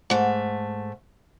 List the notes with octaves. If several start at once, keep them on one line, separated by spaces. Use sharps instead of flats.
G#2 A3